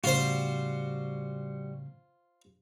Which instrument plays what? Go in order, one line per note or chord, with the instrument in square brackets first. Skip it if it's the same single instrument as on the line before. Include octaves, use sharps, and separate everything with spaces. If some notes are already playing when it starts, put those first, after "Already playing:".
[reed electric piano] A2 C#3 [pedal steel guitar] G3 F#4 [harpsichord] F4 C5